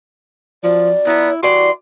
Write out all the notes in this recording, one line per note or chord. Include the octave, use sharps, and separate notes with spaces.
F2 F3 F#3 D5
F3 B3 E4 A#5
E3 G3 F#4 D5 C6